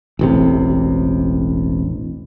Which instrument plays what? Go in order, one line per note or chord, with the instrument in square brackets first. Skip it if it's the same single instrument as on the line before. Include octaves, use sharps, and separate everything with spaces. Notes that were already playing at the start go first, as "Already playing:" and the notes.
[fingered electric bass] E1 A1 C3